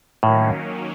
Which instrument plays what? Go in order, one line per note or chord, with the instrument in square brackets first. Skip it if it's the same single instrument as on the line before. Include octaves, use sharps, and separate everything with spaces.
[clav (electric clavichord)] A2 [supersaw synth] D#3 F#3 A#3 C#4